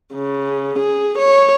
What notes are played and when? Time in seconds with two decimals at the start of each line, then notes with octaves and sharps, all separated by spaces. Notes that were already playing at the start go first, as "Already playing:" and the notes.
0.14 C#3
0.78 G#4
1.17 C#5